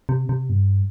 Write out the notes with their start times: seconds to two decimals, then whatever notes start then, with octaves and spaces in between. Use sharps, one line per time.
0.09 C3
0.29 C3
0.50 G2